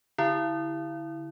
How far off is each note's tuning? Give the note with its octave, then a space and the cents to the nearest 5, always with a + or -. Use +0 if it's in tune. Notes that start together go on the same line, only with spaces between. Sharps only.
D3 +0 E4 -10